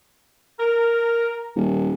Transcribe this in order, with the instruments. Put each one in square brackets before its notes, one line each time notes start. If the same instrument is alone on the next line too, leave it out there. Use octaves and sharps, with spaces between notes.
[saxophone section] A#4
[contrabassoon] D#1